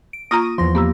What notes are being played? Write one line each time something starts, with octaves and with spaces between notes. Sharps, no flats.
D7
A#3 F4 A#5 C#6 D#6 A#6
E2 F3 C6 A#6
A#3 B3 G4 A#5 E6